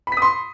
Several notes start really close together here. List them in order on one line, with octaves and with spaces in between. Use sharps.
B5 B6 D#6 C6